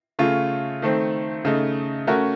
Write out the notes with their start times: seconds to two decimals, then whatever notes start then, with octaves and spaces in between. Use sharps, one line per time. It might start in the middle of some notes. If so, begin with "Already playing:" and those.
0.19 C#3 A3 C#4 F4
0.82 D#3 A3 C4
1.45 C#3 A3 D#4
2.07 A3 C#4 F#4 A#4